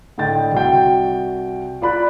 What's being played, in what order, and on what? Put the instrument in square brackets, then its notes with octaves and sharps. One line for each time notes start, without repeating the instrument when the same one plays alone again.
[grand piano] A2 D3 D#5 G5 A6
C2 F#4 G5
F4 D5 B5 F#6